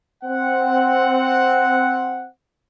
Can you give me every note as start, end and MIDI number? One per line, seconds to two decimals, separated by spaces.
0.23 2.27 60
0.23 2.27 78